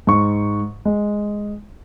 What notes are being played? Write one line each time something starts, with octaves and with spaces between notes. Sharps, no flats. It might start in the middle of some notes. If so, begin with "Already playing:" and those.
G#2 C#6
G#3